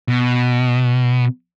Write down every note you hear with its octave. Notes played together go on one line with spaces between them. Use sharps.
B2